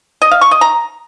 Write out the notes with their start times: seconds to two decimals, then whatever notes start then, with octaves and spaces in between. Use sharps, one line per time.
0.22 D#5
0.31 F5
0.41 C#6
0.51 D#5
0.61 A#5